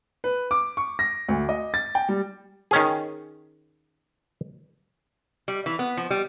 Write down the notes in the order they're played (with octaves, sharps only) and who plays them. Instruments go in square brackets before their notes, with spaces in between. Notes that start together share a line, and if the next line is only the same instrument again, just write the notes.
[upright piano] B4
D6
C#6
A#6
D2
D#5
A6
G5
G3
[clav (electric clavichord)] D#3 C#4 G#4
[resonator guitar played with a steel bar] G3
E3
B3
F3
G3